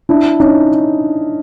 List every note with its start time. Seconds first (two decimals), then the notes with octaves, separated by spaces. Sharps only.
0.09 D4 E4
0.40 C#4 D#4